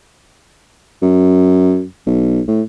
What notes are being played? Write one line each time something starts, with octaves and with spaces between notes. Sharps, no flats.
F#2
B1
A2